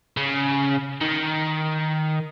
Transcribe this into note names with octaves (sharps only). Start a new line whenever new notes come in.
C#3
D#3